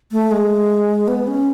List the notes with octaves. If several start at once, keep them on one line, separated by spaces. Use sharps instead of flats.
A3
G#3
B3
C#4